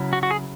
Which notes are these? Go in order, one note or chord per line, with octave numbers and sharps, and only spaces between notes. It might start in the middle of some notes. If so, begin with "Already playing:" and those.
Already playing: C#3 F#3 C#4 E4
F#4
F#4
G#4